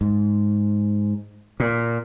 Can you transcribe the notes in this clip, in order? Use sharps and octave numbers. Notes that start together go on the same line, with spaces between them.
G#2
A#2